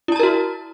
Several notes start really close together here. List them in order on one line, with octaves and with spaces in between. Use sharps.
E4 A5 A#5 A#4 F#4